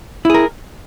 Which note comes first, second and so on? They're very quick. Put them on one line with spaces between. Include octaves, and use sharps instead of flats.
E4 G#4 A#4